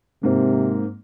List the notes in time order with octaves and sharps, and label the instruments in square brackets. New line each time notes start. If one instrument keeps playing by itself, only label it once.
[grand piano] G#2 A#3 C4 [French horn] C3